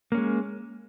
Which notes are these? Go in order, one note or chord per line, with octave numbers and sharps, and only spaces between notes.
G#3 A#3 C#4